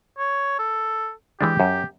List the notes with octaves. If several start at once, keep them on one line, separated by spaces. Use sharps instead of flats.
C#5
A4
E3 G#3 D4 G4
F#2